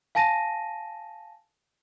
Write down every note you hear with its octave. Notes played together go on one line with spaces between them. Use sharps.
F5 G#5 A5 A#6 D#7